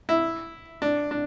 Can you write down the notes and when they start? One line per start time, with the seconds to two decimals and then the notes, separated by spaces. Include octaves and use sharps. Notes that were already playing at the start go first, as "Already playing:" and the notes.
0.09 E4
0.82 D4
1.11 D4